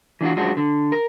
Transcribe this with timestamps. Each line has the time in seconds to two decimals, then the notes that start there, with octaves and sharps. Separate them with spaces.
0.21 E3 D4 F4 F#4
0.37 F#2 F3 G#3 D4 F#4
0.57 D3
0.92 A#4